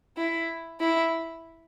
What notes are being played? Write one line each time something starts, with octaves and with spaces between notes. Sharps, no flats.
E4
E4